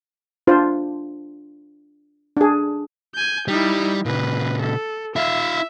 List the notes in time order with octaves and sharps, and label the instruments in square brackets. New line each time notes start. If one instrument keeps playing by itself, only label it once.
[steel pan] D4 F4 C5
D4 G#4
[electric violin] G#5 G6
[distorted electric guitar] G3 [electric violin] D#4 E4
[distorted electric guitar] A#2 C#3 [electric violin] B4
[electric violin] A4
[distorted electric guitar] E4 F5 [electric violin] E5